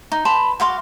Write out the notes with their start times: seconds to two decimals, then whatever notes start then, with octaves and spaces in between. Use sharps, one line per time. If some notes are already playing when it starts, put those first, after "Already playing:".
0.12 D#4
0.25 B4 A5 B5 C6
0.60 F#4 F5 C6 D6